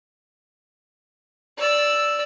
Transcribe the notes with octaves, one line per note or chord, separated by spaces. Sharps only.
D5 E6